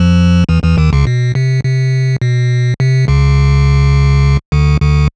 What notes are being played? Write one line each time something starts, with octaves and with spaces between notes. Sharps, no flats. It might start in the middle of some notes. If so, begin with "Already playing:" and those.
Already playing: F2 F3
E2 E3
E2 E3
D#2 D#3
C#2 C#3
B2
C3
C3
B2
C3
C#2 C#3
D2 D3
D2 D3